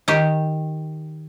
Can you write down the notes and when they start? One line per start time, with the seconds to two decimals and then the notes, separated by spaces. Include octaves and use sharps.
0.08 D#3 G4